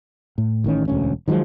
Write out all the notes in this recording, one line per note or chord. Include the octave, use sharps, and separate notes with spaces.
A2
A1 D#3 C#4
E1 D2 C#4
D#3 F3 F#3 G#3